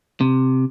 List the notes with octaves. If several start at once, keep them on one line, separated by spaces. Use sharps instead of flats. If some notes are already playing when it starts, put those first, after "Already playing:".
C3